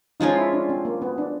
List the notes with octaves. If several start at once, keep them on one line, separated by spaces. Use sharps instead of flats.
F3 G#3 C#4 D#4 F4
E4
D4
C4
A#3
B3
D4